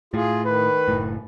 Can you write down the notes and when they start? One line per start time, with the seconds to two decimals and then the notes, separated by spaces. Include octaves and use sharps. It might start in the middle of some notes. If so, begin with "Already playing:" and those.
0.14 A2 F4 G#4
0.46 D#3 B4
0.88 F#1 A2